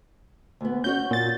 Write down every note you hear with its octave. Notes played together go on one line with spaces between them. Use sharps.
D2 B3
C#4 F#4 C#5 G6
A#2 A6